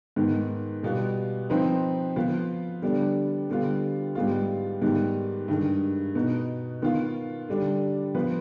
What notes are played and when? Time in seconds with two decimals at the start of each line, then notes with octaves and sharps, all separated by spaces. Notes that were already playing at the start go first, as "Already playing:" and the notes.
0.16 G#2 D#3 B3
0.83 B2 G3 B3 F4
1.50 F3 C4 D#4 B4
2.16 F3 B3 F4 B4
2.82 D3 G3 B3 D4
3.49 D3 G3 B3 F4
4.15 G#2 G3 B3 F4
4.82 G#2 D#3 G3 B3
5.48 G2 D#3 G#3
6.15 B2 B3 D#4
6.82 D#3 B3 F4
7.49 D3 G3 D4
8.15 F3 B3 F4 B4